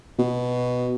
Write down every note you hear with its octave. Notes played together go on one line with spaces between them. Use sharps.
B2